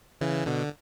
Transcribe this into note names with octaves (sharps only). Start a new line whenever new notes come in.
C#3 E3
B2 D3